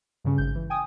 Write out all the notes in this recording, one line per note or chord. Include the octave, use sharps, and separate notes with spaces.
G2 C#3 C#4
G#1 G6
E3
G5 G#5 D#6